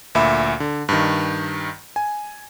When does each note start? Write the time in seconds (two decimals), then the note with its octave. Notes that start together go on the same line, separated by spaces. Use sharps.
0.15 D2 A#2 E5 B5
0.60 D3
0.89 G2 D#3
1.96 G#5